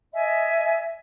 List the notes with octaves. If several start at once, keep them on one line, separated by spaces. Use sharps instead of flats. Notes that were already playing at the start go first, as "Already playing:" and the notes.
D#5 E5 G#5